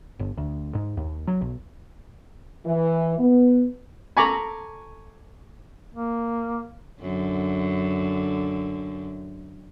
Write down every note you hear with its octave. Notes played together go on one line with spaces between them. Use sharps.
G1
D2
G#2
D#2
F#3
B1
E3
B3
A4 G#5 A#5 B5 C#6 D6
A#3
F#2 D3